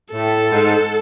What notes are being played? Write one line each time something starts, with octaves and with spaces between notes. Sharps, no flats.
A2 A4
G#2